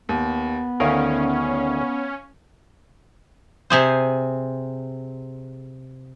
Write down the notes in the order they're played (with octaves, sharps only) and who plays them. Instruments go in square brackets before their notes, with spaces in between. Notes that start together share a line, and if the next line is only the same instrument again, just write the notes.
[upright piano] D#2 [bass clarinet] B3
[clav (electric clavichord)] D2 D#3 A#4 [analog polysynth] C#4 [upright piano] F5
[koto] C3 G#4 C5